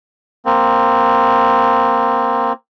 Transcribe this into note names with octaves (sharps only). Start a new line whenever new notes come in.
A#3 C4